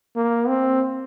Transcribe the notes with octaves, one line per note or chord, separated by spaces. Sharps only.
A#3
C4